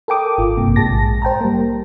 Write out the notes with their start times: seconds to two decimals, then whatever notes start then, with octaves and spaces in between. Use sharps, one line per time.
0.08 A4 A#4 G5 D6 D#6
0.38 G#1 F4
0.57 A1 G2 C3 A#3
0.76 A#1 G#2 G#4 A5 A#6
1.22 C5 G5 A5 A#5
1.41 G3 A#3